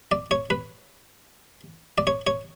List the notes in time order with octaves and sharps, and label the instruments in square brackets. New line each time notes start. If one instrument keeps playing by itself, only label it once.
[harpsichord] D5
C#5
B4
D5
C#5
C#5